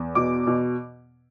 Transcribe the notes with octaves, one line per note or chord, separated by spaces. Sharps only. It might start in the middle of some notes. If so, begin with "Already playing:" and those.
Already playing: E2
B2 D6
B2